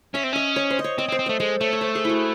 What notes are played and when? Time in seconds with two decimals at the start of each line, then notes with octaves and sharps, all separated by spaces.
0.14 C#4 E5
0.24 C4
0.33 C#4 D#5
0.56 C#5
0.70 C5
0.79 D#5
0.84 C#5
0.98 C4 D#5
1.09 C4
1.12 C5
1.19 C4
1.26 A3 C5
1.40 G#3 A4
1.61 A3 C#5
1.73 C#5
1.81 C5
1.95 G#4
2.05 E4 F#4